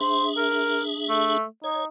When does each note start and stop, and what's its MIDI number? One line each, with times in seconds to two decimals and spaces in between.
0.01 1.37 62
0.01 1.37 68
0.01 0.25 72
0.01 1.37 76
0.37 0.81 70
1.09 1.44 57
1.64 1.86 63
1.64 1.85 73